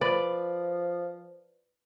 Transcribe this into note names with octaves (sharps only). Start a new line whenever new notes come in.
F3 B4 D5